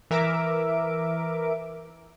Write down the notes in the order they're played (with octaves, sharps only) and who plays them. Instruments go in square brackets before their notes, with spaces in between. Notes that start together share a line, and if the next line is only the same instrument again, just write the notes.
[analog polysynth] E3 A#4 E5 D6 D7